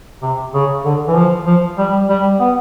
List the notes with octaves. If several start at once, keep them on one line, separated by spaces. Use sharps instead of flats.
C3
C#3
D3
E3
F3
F3
G3
G3
B3